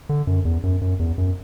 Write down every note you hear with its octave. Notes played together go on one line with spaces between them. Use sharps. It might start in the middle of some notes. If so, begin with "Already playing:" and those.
D3
F#2
E2
F#2
F#2
E2
F#2